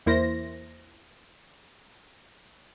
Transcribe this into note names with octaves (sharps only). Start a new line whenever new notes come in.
E2 A#3 E4 C5 A#6